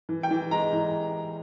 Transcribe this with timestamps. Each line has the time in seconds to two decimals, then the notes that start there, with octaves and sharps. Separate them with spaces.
0.09 E3
0.23 G5
0.31 E3
0.51 G#3 A#5
0.73 E3